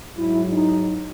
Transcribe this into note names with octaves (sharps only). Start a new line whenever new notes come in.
G#2 F#3 E4
D#4